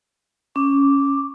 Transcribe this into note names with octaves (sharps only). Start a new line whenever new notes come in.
C#4 D6